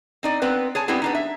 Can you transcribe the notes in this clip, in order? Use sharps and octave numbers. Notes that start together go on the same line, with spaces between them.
C4 D#4 D5
B3 C4 B4
G#4 C#5 G#5 A5
G3 B3 C4 E4 G#4
B3 D4 D#4
E5